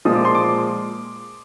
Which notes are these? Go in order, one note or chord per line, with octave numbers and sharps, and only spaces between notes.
A#2 F3 G#3 D#6
D6
C6
D6